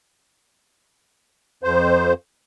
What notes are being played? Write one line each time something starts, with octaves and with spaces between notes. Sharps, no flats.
F2 C5